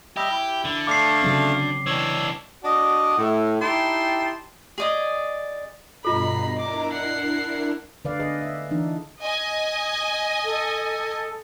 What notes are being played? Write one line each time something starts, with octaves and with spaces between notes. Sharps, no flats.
G3 G4 D#5 E5
E4
D3
A3 D4 F5 D6 C7
C#3 F#3 C4
E3 D4 C#5 E6
D4 F#4 D5 D#5
A2
D#4 E4 G4 G5 A5 C6
G#4 D5 D#5
G2 B2 F4 A4 D#5 A#5 B5 C7
D4 E4 A#4 D6
F#5 C7
D3 B4 D5 F5
G#4 B4 D#5
E5
E3 D4 D#4
D#5 G#5
A4